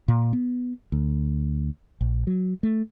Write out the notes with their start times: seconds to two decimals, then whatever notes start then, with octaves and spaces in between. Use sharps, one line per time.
0.08 A#2
0.33 B3
0.92 D2
2.01 A#1
2.27 F#3
2.63 A3